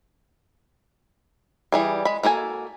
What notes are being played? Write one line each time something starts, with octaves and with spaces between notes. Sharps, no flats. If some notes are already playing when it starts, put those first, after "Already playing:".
E3 G3 G#4
G#3 B5
A#3 F#4 A4 G#5